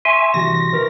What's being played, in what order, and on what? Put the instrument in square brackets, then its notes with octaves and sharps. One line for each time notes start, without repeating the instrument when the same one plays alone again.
[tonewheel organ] E5 G#5 [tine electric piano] C6 C#6
[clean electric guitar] C2 E3 F#4 [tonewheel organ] A#6
[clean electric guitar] E3 A#4 B4